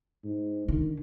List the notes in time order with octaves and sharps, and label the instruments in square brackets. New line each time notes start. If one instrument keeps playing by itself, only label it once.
[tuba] G#2
[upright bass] D3 [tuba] D#3